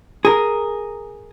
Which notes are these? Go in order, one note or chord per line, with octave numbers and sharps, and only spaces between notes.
G#4 A#4